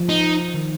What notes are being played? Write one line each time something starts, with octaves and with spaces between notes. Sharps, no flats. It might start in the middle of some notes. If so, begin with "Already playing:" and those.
Already playing: F3
D#4
D#3